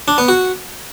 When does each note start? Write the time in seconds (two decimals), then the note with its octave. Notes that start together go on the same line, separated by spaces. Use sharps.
0.08 D4
0.18 B3
0.29 F#4